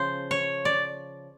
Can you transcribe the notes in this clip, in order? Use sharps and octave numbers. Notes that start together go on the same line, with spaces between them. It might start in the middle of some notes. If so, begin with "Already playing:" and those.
Already playing: C#3 F3 C5
C#5
D5